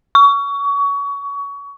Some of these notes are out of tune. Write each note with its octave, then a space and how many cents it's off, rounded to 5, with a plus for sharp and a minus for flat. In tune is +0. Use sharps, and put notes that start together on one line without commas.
C#6 +25